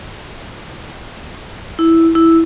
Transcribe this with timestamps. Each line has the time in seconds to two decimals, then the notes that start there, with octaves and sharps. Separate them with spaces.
1.79 E4
2.15 E4